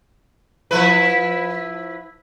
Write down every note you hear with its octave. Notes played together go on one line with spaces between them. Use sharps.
F3 E4 B4